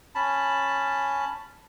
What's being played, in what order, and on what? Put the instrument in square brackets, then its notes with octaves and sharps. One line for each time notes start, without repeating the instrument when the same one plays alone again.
[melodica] C#4 A5 B5